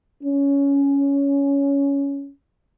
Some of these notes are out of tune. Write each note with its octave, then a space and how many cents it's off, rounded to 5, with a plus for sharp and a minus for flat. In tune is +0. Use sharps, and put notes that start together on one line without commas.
C#4 +10